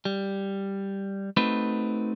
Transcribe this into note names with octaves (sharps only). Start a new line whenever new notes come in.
G3
A3 C4 D#4 F#4 B4